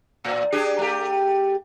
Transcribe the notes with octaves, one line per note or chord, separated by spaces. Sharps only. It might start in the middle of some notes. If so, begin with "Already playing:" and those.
A2
D4 G4 G#4
A3 G4